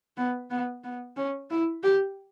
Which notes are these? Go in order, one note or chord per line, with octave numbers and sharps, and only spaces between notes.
B3
B3
B3
C#4
E4
G4